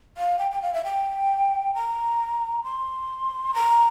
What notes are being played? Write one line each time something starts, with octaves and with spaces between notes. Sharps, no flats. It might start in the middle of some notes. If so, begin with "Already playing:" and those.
F5
G5
G5
F5
E5
G5
A#5
C6
A#5